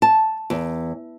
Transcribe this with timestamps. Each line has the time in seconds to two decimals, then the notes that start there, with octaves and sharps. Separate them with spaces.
0.02 A5
0.50 E2